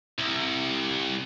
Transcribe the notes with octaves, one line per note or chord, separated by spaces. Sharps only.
C2